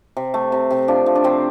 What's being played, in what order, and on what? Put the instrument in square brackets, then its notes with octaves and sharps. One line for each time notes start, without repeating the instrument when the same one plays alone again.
[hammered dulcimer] C3
A3
C3
C3
F3 D4
F3
D4
C3 C4